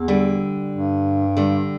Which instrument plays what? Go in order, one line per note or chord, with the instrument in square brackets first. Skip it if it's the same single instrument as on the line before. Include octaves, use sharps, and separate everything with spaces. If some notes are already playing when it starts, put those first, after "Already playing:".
Already playing: [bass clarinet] E2
[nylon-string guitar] D3 G3
[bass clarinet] G2
[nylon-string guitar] D3 G3